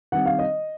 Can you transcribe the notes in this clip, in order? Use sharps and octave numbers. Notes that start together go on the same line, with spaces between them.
D#3 G3 C4 F#5
F5
D#5